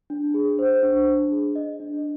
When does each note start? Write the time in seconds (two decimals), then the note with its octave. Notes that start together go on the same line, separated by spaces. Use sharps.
0.10 D4
0.34 G#4
0.59 C5
0.83 D4
1.07 D4
1.32 G#4
1.55 D#5
1.80 D4